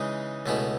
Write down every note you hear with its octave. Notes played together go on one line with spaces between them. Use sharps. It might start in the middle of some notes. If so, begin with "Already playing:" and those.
Already playing: C#3 E3 G#3 D#4
C#2 B2 A3 C#4 E4